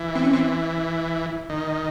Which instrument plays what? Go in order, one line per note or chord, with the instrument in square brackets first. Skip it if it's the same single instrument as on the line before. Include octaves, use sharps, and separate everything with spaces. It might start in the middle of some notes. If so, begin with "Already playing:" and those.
Already playing: [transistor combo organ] E3
[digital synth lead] C4
C#4
C4
[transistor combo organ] D#3